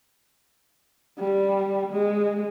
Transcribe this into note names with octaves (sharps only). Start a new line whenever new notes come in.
G3
G#3